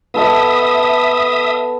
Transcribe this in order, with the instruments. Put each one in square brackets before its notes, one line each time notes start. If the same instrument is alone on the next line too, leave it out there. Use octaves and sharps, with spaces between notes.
[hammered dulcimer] B3 A4 D#5 [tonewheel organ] E5 D#6